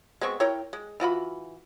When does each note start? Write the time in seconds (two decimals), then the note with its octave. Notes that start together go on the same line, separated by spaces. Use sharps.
0.21 G#3 B3 C4 C#6
0.40 E4 A#4 C#5 G5
0.73 G#3
1.00 E3 F4 F#4 B5